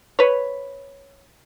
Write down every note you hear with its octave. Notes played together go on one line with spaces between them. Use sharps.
B4 C#5